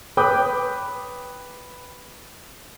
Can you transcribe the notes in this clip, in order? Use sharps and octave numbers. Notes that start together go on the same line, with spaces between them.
B4 G5 B5 D6 D#6 G6